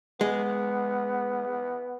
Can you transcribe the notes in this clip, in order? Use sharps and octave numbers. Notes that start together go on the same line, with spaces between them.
G#3 B3